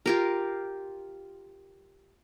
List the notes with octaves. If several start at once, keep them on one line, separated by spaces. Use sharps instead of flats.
F4 G4 A#4